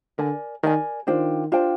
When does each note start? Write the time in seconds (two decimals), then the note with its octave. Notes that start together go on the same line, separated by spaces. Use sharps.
0.18 D3 A#4 D5 G#5
0.63 D#3 A#4 D5 G#5
1.07 D#3 D4 F4 C5 G5
1.52 D4 F4 C5 G5